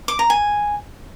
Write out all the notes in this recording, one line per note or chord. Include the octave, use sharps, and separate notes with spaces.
D6
A#5
G#5